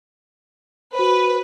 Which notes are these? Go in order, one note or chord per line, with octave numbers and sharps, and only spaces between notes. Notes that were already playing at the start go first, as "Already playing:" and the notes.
F#4 B4 C5